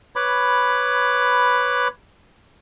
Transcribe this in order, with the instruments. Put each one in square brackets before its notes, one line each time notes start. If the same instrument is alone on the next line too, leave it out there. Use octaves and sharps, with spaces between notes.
[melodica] B4 C#5 B5 D6